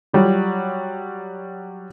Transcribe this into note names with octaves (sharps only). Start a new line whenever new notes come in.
F#3 G3 F4